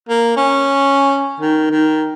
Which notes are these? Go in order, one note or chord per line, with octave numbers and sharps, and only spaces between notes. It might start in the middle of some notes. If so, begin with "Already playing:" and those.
A#3
C#4
D#3
D#3